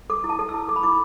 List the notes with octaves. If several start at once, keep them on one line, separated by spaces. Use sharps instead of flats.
A4 D6
E4
A5
A4
E6
E4
A4 D6
B5
E4 D6